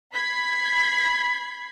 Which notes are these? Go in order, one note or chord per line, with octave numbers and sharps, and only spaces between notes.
B5 G#6 B6 C7